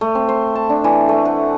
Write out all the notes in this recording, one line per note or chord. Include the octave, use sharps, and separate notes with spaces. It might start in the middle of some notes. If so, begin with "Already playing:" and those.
A3
C4
C5
A5
D4
E3
A3
F#5